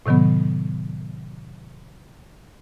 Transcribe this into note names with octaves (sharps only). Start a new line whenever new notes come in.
A2 C3 D#3 F#3 B3